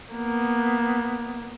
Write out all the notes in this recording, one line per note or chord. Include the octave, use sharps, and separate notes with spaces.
A#3 B3